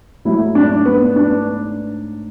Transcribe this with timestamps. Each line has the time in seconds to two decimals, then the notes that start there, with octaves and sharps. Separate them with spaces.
0.25 G#2 F#3 A3 E4
0.55 D4
0.85 B3
1.16 D4